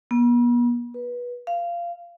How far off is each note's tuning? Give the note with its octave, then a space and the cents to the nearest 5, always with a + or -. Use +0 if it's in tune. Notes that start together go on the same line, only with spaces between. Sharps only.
B3 -40
B4 -20
F5 -15